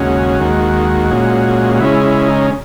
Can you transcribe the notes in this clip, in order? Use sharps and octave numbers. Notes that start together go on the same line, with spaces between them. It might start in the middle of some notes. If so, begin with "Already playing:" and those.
Already playing: D#2 C#3 G#3 C#4 F#4
D#2 D#3 G#3
A#2 G#3 C#4
F#4
C#3 G#3 C#4 E4
E4
D#4